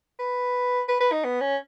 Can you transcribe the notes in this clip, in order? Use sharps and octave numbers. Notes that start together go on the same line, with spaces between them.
B4
B4
B4
D#4
B3
C#4